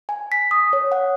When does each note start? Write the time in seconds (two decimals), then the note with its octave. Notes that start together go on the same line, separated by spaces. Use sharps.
0.09 G#5
0.32 B6
0.51 D#6
0.73 C#5
0.92 F#5